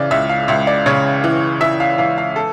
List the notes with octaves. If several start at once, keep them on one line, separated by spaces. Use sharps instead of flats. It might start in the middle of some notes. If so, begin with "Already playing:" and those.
Already playing: C#3 E3 D5
C#2 E5
F5
C#2 E5
D5
C#3 C#5
E3
E3 E5
F5
E3 F5
F5
A4